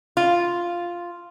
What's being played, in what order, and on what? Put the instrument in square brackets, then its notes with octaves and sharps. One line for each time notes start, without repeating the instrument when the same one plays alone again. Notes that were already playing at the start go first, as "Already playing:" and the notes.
[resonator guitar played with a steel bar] F4